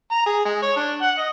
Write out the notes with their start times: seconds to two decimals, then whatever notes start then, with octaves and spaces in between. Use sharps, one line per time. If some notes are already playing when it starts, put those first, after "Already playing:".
0.11 A#5
0.26 G#4
0.45 G#3
0.62 C#5
0.76 D4
1.02 F#5
1.18 D#5